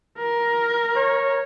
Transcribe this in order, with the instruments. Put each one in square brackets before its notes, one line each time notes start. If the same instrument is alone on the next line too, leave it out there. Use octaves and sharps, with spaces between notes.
[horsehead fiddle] A#4
[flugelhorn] C#5